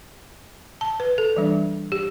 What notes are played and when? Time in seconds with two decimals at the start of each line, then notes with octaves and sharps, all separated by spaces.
0.81 A5
1.00 B4
1.18 A4
1.36 E3 G3 D4
1.92 G4